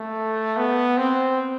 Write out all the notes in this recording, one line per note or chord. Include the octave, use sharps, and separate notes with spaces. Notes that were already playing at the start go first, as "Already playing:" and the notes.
Already playing: A3
B3
C4